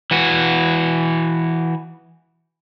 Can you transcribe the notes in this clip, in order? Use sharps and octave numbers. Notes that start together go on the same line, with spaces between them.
E3 F#4